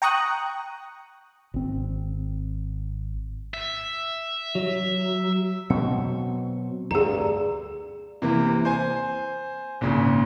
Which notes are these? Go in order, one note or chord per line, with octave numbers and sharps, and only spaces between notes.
G5 A#5 C#6 D#6 F#6
G#1 C4
E5
F#3
B2 F#3 C4 F5
D2 G2 G#4 A#5
C3 E3 A#3
C5 G#5
G#1 A#2 C#3